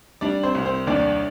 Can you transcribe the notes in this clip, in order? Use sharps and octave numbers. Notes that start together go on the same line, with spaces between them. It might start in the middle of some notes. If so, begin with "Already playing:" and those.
G3 D4 D5
C4 C5
C2
C4 C5
D#2 D4 D5